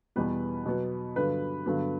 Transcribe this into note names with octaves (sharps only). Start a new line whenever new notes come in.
E2 B2 G3 B3 B4
B2 F#3 B3
G2 D3 F#3 B4
G2 D3 F#3 B3